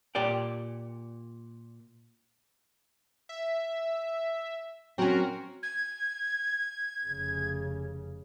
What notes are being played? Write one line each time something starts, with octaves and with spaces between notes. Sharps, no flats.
A#2 G4 D5 G5
E5
F#3 C4 C#4 F#4 A#4
G#6
F1 C#3